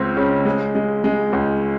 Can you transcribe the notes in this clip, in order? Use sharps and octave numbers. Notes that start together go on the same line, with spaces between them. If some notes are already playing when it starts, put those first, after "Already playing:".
Already playing: C#2 C#3 C4
C#3
G#3
G#3
G#3
C#2